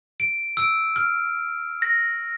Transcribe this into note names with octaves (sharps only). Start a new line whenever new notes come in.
D7
E6 D7
F6
A#6